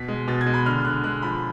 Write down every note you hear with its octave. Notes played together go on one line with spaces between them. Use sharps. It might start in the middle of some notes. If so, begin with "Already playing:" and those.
Already playing: B2 B6
G#3
B2 A6
G#6
G#3
B5
D3 F6
D3 F#6
G#3 F#6
F3 B5